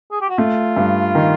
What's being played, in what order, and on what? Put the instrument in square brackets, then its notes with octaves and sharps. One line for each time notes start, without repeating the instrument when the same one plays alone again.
[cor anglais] G#4
G4
F#4
[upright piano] A3 [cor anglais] F4
[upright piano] G2
D#3